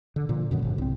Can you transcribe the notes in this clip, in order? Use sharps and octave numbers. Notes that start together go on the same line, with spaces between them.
D3
A#2 D3 F3
F#2 B2 D#3 F#3
G1 G#2
C2 C4